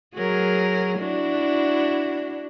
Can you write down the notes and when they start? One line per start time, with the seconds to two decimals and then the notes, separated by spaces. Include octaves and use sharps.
0.15 F#3 G#4 A#4
0.99 D4 E4 F#4